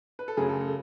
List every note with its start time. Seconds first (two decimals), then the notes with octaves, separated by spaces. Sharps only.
0.19 B4
0.28 A4
0.37 F#2 C#3 F#3 A3 G#4
0.49 A4
0.61 A4